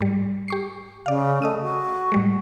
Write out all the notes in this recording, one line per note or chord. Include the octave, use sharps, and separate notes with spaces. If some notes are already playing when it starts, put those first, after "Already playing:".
G#2 G3
G4 C#6 C7
C#3 D5 F5
A3 D#5 D#6 D#7
F#4
A2 G3 G#3